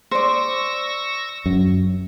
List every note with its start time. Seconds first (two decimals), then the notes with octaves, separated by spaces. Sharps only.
0.11 C5 D5 C#6 E6 A#6
1.46 F#2